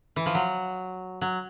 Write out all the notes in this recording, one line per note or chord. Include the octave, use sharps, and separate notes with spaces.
E3
F3
F#3
F#3